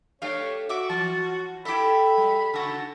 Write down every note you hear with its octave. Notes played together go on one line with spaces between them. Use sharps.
A3 D4 G4 C#5 F5
F#4 E5 D6
E3 A5
E4 G4 A4 E5 B5
G3
C#3 F#4 A4